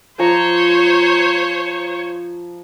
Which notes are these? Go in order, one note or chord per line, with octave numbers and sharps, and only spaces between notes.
F3 C5 C#5 A#5